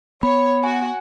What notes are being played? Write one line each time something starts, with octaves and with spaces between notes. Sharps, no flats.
B3 C#5 B5
F#4 G#5